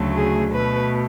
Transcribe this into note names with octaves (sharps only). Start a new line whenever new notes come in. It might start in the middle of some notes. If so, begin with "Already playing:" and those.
Already playing: D2 C#3 F#3 A3
G#4
B2 A3 B4